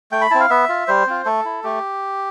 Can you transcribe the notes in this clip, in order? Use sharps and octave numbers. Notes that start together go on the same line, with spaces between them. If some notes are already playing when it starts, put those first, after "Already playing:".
A3 G5
B5
C4 E4 A5
F5
B3 E5
F4
G3 C5
C4 F4
A3 A4
E4
A3 G4